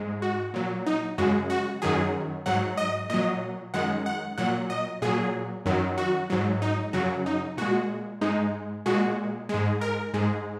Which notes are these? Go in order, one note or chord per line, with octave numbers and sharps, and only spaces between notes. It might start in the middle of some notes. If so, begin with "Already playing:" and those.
Already playing: G#2 G#3
F#4
A#2 F#3
D#4
F#2 C#3 G#3 F#4
F#4
F#2 D#3 F#3 G#4
G#2 F#3 F#5
D#5
A#2 F#3 D#5
F#2 D#3 G#3 F#5
F#5
A#2 F#3 F#5
D#5
A#2 F#3 G#4
F#2 D#3 F#3
F#4
G#2 F#3
D#4
F#2 C#3 F#3 F#4
D#4
A#2 G#3 F#4
G#2 G#3 D#4
A#2 G#3 F#4
G#2 G#3
A#4
G#2 G#3